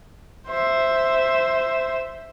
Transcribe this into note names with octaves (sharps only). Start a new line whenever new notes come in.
C5 E5